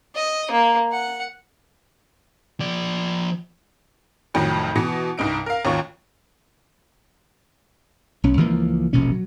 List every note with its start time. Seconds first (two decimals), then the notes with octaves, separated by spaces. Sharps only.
0.16 D#5
0.51 A#3
0.93 F#5
2.60 F3 D5
4.34 C2 F2 A2 D#3 F#3
4.76 B2 E3 A#6 C#7
5.18 C2 G2 D#4 D7
5.46 A#4 F5
5.65 G#1 D#2 C#4 F4 C#6
8.24 B1 C#4
8.37 C#2 E3 F3 A#3
8.93 E1 A#1 B2 C#4
9.12 F#3